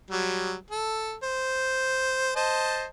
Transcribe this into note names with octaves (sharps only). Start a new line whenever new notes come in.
F#3 G3
A4
C5
C5 D#5 A5